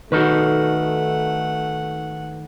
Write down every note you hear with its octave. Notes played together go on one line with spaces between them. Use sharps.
D#3 A3 D#4 F#4 A4 B4 F#5